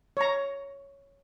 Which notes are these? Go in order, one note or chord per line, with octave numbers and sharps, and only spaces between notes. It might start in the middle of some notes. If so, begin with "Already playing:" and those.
C#5 A#5